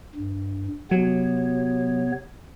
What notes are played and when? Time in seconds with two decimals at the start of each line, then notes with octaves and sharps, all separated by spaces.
0.15 G2
0.91 C3 F#3 B3 C#5